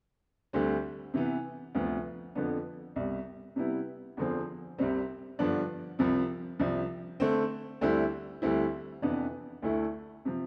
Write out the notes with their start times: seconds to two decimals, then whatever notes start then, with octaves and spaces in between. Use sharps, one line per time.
0.53 D2 D3 G3 C4
1.14 C3 E3 B3
1.75 D2 C3 F3 B3
2.35 F2 D3 F3 B3 D4
2.96 C2 B2 G3
3.56 C3 G3 B3 E4
4.17 E2 D3 F3 C4
4.78 C2 C3 G3 C4
5.39 G2 D3 F3 B3 D4
5.99 C2 C3 F3
6.59 C2 C3 F3
7.20 D3 A3 C4
7.81 D2 D3 G3 C4 E4
8.42 D2 D3 G3 C4 E4
9.02 F2 C3 E3 B3 D4
9.62 D2 D3 A3 E4
10.25 C3 F3